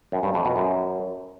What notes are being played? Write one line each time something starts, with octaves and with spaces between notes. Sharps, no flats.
F#2
G2
F2
B2
F#2